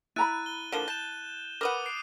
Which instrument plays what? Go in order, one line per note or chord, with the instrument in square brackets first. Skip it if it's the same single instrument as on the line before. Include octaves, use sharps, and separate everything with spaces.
[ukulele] E4 A#5 B5 [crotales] F#6 A6 D#7
[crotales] G7
[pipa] D3 F3 A#3 [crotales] E7 G7
[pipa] A5 [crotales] G6 E7
[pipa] A#4 B4 F#5 [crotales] D6 D#6 D#7
[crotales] C7 D7